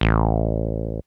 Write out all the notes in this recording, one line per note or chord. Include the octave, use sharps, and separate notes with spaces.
A1